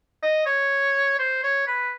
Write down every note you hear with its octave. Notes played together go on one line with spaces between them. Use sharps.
D#5
C#5
C5
C#5
B4